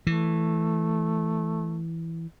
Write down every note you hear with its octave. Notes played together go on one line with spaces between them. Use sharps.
E3 A3